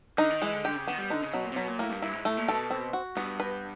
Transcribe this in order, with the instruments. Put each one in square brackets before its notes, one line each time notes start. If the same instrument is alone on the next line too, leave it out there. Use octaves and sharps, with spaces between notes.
[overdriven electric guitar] D3 [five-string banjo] D#4
[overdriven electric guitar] D#3
[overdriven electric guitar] E3 [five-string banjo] G#3
[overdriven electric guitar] D3
[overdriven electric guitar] D3 [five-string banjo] G4
[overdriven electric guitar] C#3
[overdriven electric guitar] D#3 [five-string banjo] B3
[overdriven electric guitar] G3
[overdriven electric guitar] D3 [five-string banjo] D#4
[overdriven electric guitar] C#3
[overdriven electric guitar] B2 [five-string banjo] F#3
[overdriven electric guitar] A#2
C3
[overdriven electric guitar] B2 [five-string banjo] F#3
[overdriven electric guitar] A#2
[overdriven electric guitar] A2 [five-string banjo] A#3
[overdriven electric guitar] G2
[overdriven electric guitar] G2 [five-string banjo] E4
[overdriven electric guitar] G#2
[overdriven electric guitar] A2 [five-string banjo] A3
[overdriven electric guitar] A#2
[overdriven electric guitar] B2 [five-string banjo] A4
[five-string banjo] C4
F#4
[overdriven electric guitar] G2 [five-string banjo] B3
[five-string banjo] B4